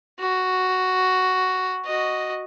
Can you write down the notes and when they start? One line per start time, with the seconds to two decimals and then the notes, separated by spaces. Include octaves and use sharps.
0.20 F#4
1.85 F#4 D#5